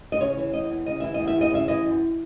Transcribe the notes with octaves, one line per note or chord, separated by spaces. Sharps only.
D#5
C#3 C#5
E3
E2 D#5
E2
C#3 D#5
E3 E5
E2 D#5
E5
E2
D#5
C#3 E5
E3 D#5
F#2